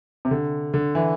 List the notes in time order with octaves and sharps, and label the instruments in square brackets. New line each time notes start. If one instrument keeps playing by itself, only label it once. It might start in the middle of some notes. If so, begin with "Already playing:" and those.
[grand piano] C3
D3
D3
E3